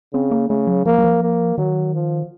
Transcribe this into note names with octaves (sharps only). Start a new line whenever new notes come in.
C#3 C4
A#3
C#3 A3
F#3
F3 A#3
F#3
F3
A#3
D#3 F#3
F3